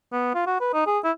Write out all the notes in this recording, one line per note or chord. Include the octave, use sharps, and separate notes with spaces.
B3
F4
F#4
B4
D#4
G#4
E4